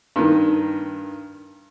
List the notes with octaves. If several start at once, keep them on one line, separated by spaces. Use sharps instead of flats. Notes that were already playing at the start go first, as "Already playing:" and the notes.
G2 D#3